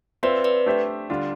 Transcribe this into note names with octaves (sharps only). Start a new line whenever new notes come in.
C4 F4 B4 C5 D5 E5
B4 D5
A3 D4 G4 C5 E5
D3 G3 D4 F4